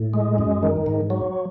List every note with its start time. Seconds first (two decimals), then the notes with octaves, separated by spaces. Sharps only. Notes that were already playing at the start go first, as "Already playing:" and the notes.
Already playing: A2
0.14 G#3
0.38 F#2
0.63 D#3
0.86 G#2
1.10 F#3